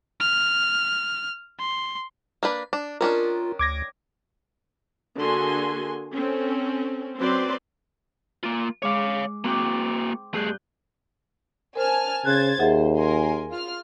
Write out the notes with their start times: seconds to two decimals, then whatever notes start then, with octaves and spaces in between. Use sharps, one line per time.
0.20 F6
1.59 C6
2.43 A#3 D4 B4
2.73 D4
3.01 D#3 C#4 D4 F4 A#4
3.59 D2 D6 G#6 A#6
5.18 D3 A#3 F#4 G#4 G#5 C6
6.14 C4 C#4 A4
7.19 F#3 C4 B4 C5 D5 C6
8.43 A#3 F4
8.82 G#3 C#5 F5 D6
9.44 A#3 C4 F#4 G5 D6
10.34 G2 A3 G#4 F#6 G6
11.76 A#4 C5 G#5 A5 F6
12.25 C#3 C5 F#6 G#6 A6
12.59 D#2 G#4 C5 E5 F#5
12.97 A#4 G#5 C6
13.51 F4 F6